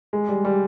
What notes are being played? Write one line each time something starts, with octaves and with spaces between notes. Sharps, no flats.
G#3
G3
G3